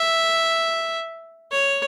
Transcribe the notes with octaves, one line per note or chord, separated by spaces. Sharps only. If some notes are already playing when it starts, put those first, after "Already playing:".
Already playing: E5
C#5